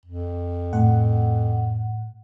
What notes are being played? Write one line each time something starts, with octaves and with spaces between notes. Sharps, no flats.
F2
A2 F#5